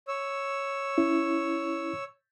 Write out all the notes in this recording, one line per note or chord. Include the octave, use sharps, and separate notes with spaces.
C#5 E6
C#4 E4